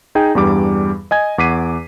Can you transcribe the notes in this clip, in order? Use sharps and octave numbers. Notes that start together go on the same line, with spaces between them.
D#4 G#4 G5
E2 G2 G3 D6
D#5 G#5 G#6
E2 F#5 D6 B6 C7 D#7